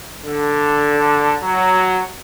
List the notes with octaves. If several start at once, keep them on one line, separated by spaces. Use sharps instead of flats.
D3
F#3